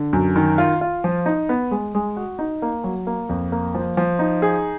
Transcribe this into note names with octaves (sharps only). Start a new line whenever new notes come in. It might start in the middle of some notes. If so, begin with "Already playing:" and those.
Already playing: D3
F#2
D#3
F4
F4
F3
D#4
B3
G#3
G#3
F#4
D#4
A#3
F#3
A#3
F2
A#3
F3
F3
D#4
G#4